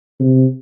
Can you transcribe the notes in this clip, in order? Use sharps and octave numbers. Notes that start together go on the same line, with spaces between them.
C3